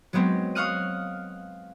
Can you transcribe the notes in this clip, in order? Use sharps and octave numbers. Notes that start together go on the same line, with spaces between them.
F#3 G#3 B3 C4
F5 C#6 D#6 F6 F#6 D#7